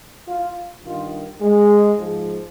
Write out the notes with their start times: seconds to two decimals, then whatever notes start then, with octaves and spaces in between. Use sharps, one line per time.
0.28 F4
0.84 G2 D#3 F4
1.40 G#3
1.96 G#2 F3